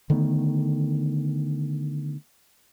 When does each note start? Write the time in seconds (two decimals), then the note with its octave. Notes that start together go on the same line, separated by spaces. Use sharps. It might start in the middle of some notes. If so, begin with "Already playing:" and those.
0.10 D3 D#3 A3 B3